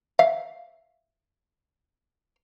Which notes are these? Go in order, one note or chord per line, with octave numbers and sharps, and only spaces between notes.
E5 F5